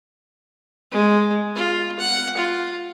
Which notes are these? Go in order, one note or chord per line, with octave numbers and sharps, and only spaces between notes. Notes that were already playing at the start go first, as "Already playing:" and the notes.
G#3
F4
F#5
F4